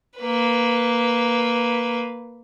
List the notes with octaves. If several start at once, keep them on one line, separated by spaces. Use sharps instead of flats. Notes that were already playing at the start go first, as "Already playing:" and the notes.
A#3 B4